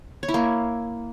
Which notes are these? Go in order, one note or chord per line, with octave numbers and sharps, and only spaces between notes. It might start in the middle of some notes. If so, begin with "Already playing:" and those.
C#5
E4
A#3